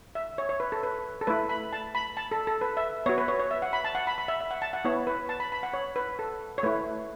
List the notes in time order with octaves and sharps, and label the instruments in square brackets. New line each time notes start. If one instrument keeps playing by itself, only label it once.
[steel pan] E5
C#5
C#5
B4
A4
B4
A4
A3 E4 B4
B5
A5
B5
A5
A4
A4
B4
E5
B3 C#5
F#4
B4
C#5
C#5
E5
F#5
B5
A5
F#5
B5
B5
E5
E5
F#5
A5
F#5
B3 E4 C#5
B4
A5
B5
B5
F#5
C#5
B4
A4
C#5
A3 E4 B4